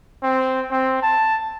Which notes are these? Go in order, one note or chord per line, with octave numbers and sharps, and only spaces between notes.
C4
C4
A5